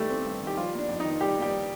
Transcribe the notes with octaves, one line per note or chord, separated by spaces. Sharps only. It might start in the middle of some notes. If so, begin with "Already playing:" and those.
Already playing: G2 D#3 G3 A3 G4 A4
C4
G2
D#3 G4
F3 G3 F4
A#3
D4
F2
D#4
D#3
G3 G4
A#3
G3 G4